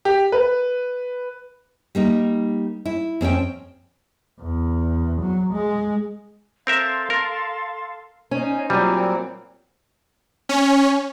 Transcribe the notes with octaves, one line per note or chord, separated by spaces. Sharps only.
G4
B4
G3 A#3 D#4
E4
F2 C4 C#4 G5
E2
F#3
G#3
C4 A4 A#4 E5 F5 C6
A#4
C#4 D#4 C5 G#5
A#2 F#3 G3 C4
C#4